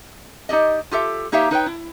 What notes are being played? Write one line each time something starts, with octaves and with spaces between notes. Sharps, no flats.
D#4 G4 D5 D#5
F4 G4 A4 E5
A#3 D#4 G4 C#5 E5 F5
D#4 B4 C#5 G5
E4